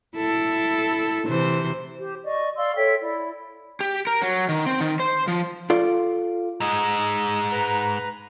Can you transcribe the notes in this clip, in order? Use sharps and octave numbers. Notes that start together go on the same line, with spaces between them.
E4 A4
C3 E3 C5
G4 C5
D5 D#5 C#6
D5 F5 C6 E6
A4 C#5 E5 G5
E4 D5
G4
A#4
F#3
D#3
C4
D#3
C5
F3
F4 A4 D5
G#2 G#3 D#5 E6
B4 A#5